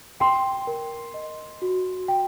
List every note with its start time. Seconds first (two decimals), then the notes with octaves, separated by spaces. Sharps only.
0.20 G5 C6
0.67 A#4
1.14 D#5
1.62 F#4
2.08 G5